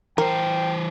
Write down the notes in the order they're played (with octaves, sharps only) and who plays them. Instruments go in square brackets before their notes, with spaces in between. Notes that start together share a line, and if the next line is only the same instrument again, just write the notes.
[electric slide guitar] E3 C5 [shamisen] A#4 [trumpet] G5